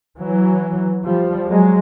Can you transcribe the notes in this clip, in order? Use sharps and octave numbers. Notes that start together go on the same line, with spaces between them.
E3 F#3
F3 G3
F#3 G#3